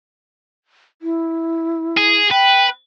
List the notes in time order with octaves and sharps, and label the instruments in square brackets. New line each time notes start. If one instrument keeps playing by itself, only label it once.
[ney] E4
[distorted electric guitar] G#4
[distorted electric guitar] B4 [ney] G5